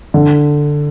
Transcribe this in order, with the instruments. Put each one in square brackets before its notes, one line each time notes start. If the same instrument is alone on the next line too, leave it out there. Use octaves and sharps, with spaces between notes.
[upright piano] D3